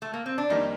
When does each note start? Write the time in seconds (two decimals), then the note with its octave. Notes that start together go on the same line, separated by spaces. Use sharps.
0.02 A3
0.13 A#3
0.26 C4
0.38 D4
0.50 F2 D#3 G3 A#3 D#4